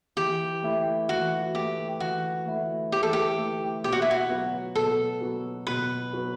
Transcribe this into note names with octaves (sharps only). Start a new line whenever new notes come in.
E3 G4
A3 E4
E3 F#4
A3 E4 G4
E3 F#4
A3 E4
E3 G4
A4
G4
A3 E4
B2 G4
F#4
E4
F#4
F#3 B3
B2 A4
F#3 B3
B2 B4
F#3 B3